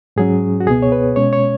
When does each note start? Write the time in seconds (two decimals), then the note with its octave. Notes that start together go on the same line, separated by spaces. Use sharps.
0.16 G#2 F#3 C#4 G#4
0.60 F#4
0.67 C#2 B2 B3 G#4
0.82 C#5
0.92 B4
1.16 B2 G#3 C#4 C#5
1.33 C#5